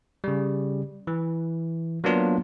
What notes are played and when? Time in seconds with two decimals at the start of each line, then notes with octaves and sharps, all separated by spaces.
0.24 C#3 G3
1.07 E3
2.04 F#3 A#3 B3 D4 F4